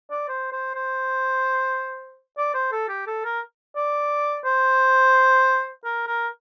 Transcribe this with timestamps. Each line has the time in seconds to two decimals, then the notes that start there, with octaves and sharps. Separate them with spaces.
0.11 D5
0.29 C5
0.52 C5
0.75 C5
2.38 D5
2.54 C5
2.72 A4
2.89 G4
3.07 A4
3.25 A#4
3.76 D5
4.45 C5
5.85 A#4
6.07 A#4